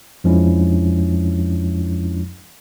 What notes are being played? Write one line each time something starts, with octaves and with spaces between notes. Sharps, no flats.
F2 F3 G#3 C#4 D4 E4